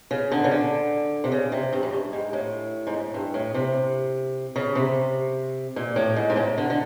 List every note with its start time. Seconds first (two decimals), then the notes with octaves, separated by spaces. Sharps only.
0.11 C#3
0.31 D3
0.44 C#3
0.51 D3
1.24 C3
1.32 C#3
1.52 C3
1.73 G2
1.83 F#2
1.93 G2
2.13 G#2
2.33 A2
2.87 G#2
2.94 A2
3.14 G2
3.34 A2
3.54 C3
4.56 C#3
4.75 C3
5.76 A#2
5.96 A2
6.16 G#2
6.30 G#2
6.37 A2
6.58 D3
6.70 D3